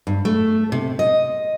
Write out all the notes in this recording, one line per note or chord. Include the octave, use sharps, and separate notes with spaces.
G2
A3
C3
D#5